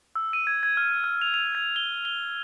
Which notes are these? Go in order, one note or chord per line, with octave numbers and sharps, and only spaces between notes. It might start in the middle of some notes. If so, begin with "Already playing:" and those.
E6
D#7
G#6
G#6
F6
F6
F7
F7
G#6
G7
G7